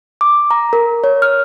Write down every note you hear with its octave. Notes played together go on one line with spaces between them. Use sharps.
D6
A#5
A#4
C#5
F6